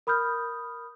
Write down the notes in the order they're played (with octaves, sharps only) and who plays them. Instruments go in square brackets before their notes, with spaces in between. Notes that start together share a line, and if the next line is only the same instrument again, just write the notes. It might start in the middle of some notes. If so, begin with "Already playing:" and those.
[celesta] A#4 B5 D#6 F6 G6